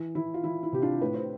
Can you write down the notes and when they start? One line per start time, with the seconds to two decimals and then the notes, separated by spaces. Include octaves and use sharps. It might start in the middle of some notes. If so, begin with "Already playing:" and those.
Already playing: E3
0.15 E3 E4
0.34 F4
0.44 E3 E4
0.63 E4
0.73 C3 G4
0.82 D4 F4
1.01 A2 B4
1.14 C5